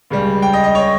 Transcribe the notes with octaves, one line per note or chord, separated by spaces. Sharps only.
C#2 C#3 G3
G5
D#5
D#5
C#5